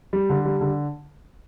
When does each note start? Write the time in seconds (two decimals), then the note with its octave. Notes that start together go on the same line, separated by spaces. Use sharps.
0.13 G3
0.29 D3
0.45 G3
0.61 D3